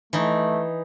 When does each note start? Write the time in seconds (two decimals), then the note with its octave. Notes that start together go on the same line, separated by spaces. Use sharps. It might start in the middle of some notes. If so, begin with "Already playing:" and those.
0.13 E3 A3 D#4